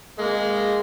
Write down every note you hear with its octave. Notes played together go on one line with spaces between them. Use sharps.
G#3 A#3